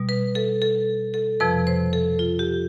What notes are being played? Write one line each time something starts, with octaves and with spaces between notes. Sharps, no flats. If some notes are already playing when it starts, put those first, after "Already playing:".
Already playing: B2 G3
B4
A4
A4
A4
F2 C3 F3 B4
C5
A4
F4
G4